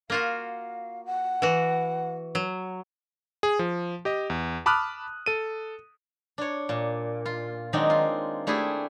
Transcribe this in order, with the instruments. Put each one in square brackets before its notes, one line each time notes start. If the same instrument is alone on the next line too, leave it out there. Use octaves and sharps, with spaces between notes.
[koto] A#3 F4 F#4 [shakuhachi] F5
[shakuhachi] F#5
[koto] E3 F#4
F#3
[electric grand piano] G#4
F3
G4 D#5
E2
A5 B5 D6 D#6 F6 F#6
A4 D#7
[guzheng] D4 C#5
A#2
F4
D#3 F#3 G#3 C4 D4 D#4
F4
A3 D4 E4 G4 G#4